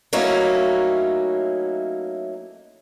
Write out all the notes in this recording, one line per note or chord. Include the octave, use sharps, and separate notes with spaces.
F#3 A3 A#3 C#4 D#4 E4